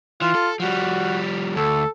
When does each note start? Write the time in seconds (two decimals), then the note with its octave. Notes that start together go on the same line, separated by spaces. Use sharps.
0.22 E3 F4
0.35 A4
0.60 F3 G3 F#4
1.56 D2 A4